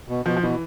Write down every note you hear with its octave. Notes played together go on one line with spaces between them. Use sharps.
B2
B2 F3
F3
B2 E3